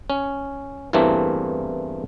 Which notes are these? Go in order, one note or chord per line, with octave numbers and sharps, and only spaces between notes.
C#4
E2 G2 E3 A3 A#3 C4